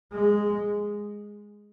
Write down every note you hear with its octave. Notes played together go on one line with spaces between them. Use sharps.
G#3